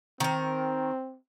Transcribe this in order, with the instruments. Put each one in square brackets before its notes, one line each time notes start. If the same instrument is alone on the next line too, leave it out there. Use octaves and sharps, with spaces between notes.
[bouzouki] D#3 A#4 [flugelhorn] C4